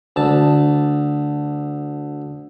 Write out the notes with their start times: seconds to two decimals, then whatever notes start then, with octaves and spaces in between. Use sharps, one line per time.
0.16 D2 A5